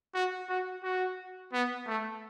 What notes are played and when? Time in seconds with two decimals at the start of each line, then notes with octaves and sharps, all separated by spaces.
0.14 F#4
0.49 F#4
0.83 F#4
1.53 B3
1.87 A3